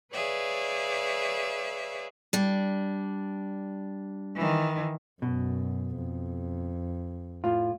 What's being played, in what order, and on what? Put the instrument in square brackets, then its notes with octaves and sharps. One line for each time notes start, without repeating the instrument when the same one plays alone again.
[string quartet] G#4 B4 C#5 D5 E5 F5
[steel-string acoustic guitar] G3 D4
[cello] D#3 E3
[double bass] F#2 [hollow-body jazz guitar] B2
[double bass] F2
[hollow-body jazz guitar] A2 F4